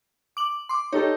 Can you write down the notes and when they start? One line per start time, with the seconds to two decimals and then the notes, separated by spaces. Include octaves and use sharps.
0.37 D6 F#7
0.69 C6 D6
0.93 D#4 G4 A4 C#5